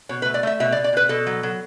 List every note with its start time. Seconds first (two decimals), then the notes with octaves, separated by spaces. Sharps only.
0.09 B2 C#5
0.22 B4
0.26 A3
0.34 D5
0.43 A3 E5
0.60 B2 E5
0.72 D5
0.77 B2
0.84 D5
0.93 B2 B4
1.09 B2 A4
1.27 F#3
1.43 F#3